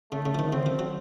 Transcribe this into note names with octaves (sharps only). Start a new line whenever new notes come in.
C#3 A3
C#3
F3
D#3
C#3 C4
F3
F#3